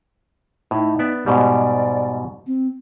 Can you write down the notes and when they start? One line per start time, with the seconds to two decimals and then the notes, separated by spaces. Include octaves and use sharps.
0.71 A2 D#4
0.99 B3 D5 E5
1.26 G#2 B2 G3 D5
2.47 C4